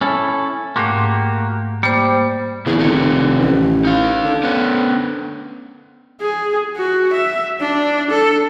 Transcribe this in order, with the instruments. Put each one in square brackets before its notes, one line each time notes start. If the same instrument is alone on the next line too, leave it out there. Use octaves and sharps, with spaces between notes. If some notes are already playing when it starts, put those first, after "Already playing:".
[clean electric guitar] C#4 E4 A4
[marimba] G#2 A3 [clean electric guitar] A#3 F#4 G4
[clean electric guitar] G3 [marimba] A#3 C5
[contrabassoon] E2 [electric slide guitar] C#3 D4 G#4
[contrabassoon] F1 [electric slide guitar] D#3 D#4 A4
[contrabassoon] A1
[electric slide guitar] D#4 F5
[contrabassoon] D3
[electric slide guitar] B3 C#4
[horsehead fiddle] G#4
F#4
E5
D4
A4